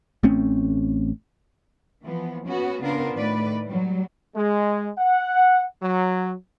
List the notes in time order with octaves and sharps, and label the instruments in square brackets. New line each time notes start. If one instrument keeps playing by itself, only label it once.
[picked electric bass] A1 A3 C4 C#4
[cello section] E3 F3 B3
B3 C#4 F#4
C#3 B3 D4 F4 A#4 C5
A2 D#3 B4 D5
F#3 G3
[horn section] G#3
F#5
F#3